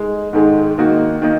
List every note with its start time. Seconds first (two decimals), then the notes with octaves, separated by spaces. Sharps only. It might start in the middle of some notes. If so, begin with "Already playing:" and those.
Already playing: G#3 D#4
0.33 G#2 D#3 G#3 D#4
0.78 D#3 A#3 D#4 F#4
1.22 D#3 A#3 D#4